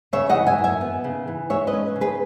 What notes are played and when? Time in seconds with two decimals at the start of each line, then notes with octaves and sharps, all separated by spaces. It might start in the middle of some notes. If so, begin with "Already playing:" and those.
0.13 C#3 C#5 E5
0.29 D#5 F#5
0.35 E3
0.47 E5 G#5
0.58 F#2
0.64 E5 G#5
0.81 B3
1.04 C#3
1.27 E3
1.50 G#3 C#5 E5
1.67 B4 D#5
1.73 C#4
1.96 C#3
2.01 G#4 B4